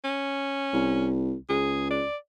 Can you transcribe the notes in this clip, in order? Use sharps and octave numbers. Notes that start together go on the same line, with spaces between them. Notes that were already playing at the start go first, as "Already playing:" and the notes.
C#4
C2
C#2 G#4
D5